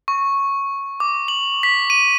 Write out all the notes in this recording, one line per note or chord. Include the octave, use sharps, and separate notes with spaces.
C#6
D6
F#7
B6
D#7